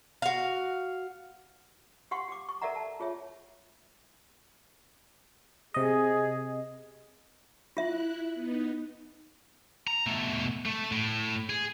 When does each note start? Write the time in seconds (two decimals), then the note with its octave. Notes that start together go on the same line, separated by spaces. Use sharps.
0.22 F#4 F5
2.11 G4 F5 F#5 C6 C#6
2.28 G4 D6
2.49 C#6
2.61 A4 A#4 D5 E5 F#5 A#5
2.76 A5
3.00 F4 G#4 C#5 E5
5.74 C3 G#4 D#5
7.77 E4 F4 E5 F#6
8.34 B3 D#4
9.87 A#5
10.07 B2 A3
10.66 A3
10.92 A2
11.50 G#4